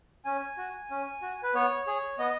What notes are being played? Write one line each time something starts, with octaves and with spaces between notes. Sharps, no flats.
C#4 G#5
F#4
C#4
F#4
B4
B3 C#5
G#4 C#5
B3 D#5